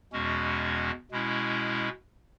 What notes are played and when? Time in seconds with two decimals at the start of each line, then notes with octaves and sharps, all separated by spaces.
0.12 E2 B2 G#3 C#4 F#4
1.11 B2 G#3 C#4 E4